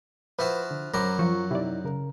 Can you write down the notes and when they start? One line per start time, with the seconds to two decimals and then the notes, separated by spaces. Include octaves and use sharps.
0.39 F3 E4 F#4 B4
0.71 D3
0.94 F#2 F#3 C5 A#5 B5 D6
1.19 F3 F4 C#6
1.51 C3 D#4 E4 D5
1.84 C#3 A#4